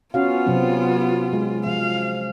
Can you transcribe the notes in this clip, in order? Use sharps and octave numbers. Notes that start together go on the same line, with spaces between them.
B3 C#4 F4 F#4 F5
C3 F#3 C4
G#3
F3 F5